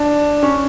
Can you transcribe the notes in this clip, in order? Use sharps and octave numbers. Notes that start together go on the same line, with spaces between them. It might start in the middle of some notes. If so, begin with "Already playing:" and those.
Already playing: D4
C#4